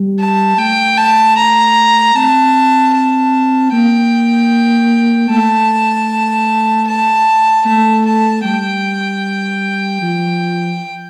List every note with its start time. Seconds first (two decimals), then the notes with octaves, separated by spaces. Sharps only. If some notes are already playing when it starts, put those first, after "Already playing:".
Already playing: G3
0.19 A5
0.58 A3 G5
0.97 A5
1.37 A#5
2.15 C4 A5
2.94 A5
3.72 A#3 G5
5.30 A3 A5
6.87 A5
7.65 A3 A5
8.05 A5
8.44 G3 G5
10.02 F3